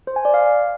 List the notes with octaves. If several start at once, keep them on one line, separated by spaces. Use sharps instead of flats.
C5
G#5
D5
F5